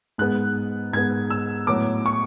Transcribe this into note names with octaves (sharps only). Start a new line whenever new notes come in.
G#2 G#3 B3 F#6
G#2 G#3 B3 G#6
E6
A2 F#3 B3 D6
C#6